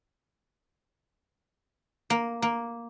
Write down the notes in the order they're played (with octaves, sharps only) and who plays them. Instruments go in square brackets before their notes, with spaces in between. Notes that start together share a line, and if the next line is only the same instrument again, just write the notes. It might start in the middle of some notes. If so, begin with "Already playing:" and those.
[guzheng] A#3
A#3